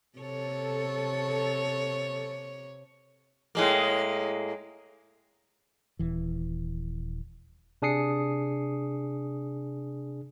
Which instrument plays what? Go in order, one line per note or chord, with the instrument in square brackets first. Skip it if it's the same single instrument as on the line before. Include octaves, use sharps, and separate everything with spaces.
[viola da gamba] C3 C#5 [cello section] A4
[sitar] A2 G#3 A#3
[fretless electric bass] D#1 E3
[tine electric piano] C3 D4 G#4 D#6 C7 C#7